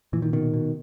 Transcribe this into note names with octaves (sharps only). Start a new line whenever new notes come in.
A#2 E3
D#3
B2 D#3
B2